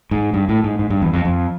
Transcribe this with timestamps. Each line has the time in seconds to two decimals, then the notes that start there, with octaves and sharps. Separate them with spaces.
0.11 G#2
0.34 G2
0.49 A2
0.64 G#2
0.79 G#2
0.90 G2
1.02 E2
1.13 F2
1.25 F2